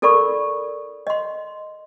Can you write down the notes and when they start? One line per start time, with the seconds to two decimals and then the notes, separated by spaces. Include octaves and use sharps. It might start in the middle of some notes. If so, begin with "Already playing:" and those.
0.02 E4 A4 A#4 D5 B5 C#6
1.07 D#5 C6